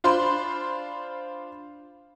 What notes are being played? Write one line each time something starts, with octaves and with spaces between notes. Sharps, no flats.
D4 F4 C5 B5 C6